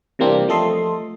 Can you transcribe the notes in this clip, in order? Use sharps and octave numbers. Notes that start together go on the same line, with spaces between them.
C3 E3 G3 A#3 C4 D4
F3 A3 A4 D#5 C6